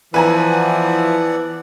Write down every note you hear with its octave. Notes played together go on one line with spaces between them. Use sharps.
E3 F3 B3 B4 D5 F#5 G#5 A#5